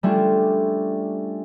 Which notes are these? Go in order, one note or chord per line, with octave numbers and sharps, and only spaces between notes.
G3 A3 C#4 D4 F4